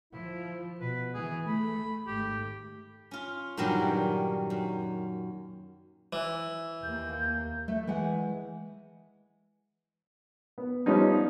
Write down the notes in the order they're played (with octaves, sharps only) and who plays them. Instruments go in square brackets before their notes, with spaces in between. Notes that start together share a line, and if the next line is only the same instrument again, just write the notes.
[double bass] F3 [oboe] E4
[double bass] B2 [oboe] B4
[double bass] E3 [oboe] G#4
[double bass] A3 [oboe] B5
[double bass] G#1 A3 [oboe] G4
[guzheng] C#4 F4
G2 A#2 D#3 F#3 G3 C#4
F#2
[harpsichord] E3
[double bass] D#2 A#3 [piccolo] G6
[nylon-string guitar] A3
E3 G#3 F#5
[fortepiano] B3
F3 G3 B3 C#4 D#4